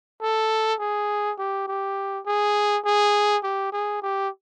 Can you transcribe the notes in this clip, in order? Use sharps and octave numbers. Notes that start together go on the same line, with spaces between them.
A4
G#4
G4
G4
G#4
G#4
G4
G#4
G4